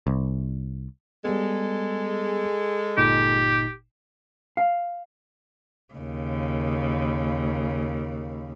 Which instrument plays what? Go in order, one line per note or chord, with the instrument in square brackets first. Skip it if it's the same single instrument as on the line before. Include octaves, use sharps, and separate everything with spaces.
[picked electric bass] C2
[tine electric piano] G3 B3 [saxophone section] G#3 A4
[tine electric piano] G1 A#2 D#4 [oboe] G4
[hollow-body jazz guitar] F5
[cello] D#2 C#3